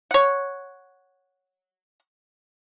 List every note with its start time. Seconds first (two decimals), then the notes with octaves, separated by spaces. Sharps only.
0.11 C#5 F#5